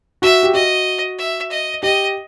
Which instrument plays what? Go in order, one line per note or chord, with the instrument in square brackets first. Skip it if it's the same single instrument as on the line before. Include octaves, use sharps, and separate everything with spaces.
[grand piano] F#4 [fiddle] E5
[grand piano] G4
[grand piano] F#4 [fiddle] D#5
[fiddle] E5
D#5
[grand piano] G4 [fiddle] D#5